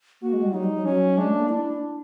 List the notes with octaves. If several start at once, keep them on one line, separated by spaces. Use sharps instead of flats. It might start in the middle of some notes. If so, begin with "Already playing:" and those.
A#3 F#4
G#3
G3
F#3 D#4
G3
F#3
F#3 C#4
G#3 D4
A3
A#3
D4 E4